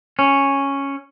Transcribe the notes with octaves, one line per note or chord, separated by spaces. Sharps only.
C#4